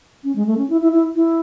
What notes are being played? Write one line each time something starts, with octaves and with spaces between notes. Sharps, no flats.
C#4
G#3
A3
C#4
E4
E4
E4
E4